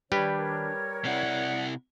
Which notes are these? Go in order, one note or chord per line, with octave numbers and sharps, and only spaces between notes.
D#3 G3 D4 G4 B4 C#5
A#4 C#5
C3 E4 D5 F#5